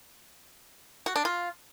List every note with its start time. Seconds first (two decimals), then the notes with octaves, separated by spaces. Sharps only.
1.06 F#4
1.16 D4
1.25 F4